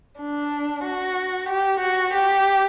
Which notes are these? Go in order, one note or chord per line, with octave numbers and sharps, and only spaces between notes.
D4
F#4
G4
F#4
G4